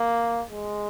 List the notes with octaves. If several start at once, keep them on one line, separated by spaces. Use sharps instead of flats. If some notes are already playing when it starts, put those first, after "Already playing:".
Already playing: A#3
G#3